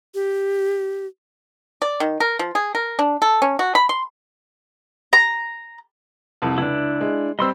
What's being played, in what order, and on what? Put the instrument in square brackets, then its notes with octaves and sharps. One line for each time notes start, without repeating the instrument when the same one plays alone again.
[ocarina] G4
[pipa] D5
D#3
A#4
F3
G#4
A#4
D4
A4
C#4
F#4
B5
C6
[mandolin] A#5
[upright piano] C2 F2
[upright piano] C#2 [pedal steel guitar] D4 E4
[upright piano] G#3
[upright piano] G3 C4 [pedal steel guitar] D#5 C6 E6